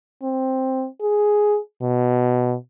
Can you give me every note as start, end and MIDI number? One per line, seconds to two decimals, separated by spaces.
0.23 0.86 60
1.01 1.58 68
1.82 2.56 47